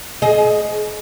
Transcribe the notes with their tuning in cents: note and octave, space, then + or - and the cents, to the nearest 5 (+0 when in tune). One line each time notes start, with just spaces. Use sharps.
G#4 +30 D#5 +0